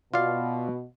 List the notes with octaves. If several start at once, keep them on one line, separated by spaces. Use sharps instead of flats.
B2 F4 D5 F5